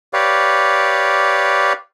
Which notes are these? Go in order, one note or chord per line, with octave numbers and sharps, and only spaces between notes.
G4 B4 C#5 D5 F5